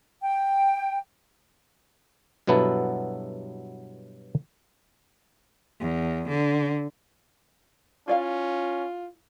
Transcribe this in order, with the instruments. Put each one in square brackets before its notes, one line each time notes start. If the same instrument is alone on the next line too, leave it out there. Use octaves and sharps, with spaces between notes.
[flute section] G5
[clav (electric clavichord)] G2 B2 F#3 B3 E4 A4
[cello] E2
D3
[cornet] C#4 [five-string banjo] E4 D5 F5 [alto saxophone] F4